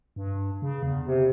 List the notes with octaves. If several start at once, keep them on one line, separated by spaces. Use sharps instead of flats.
G2
C#3
E2
C3